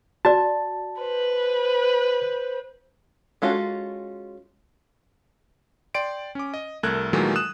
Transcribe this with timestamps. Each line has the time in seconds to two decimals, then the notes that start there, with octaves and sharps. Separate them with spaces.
0.25 F#4 D5 A5
1.01 B4 C5
3.42 G#3 C#4 F4 F#4 A4
5.95 D5 G5 C6 D7
6.35 C#4 D6
6.54 D#5
6.83 C2 A3 A4 A#4 F#6 G#6
7.13 A#2 D#3 E3 F#3 G#3 A3
7.36 D#6 F#6 E7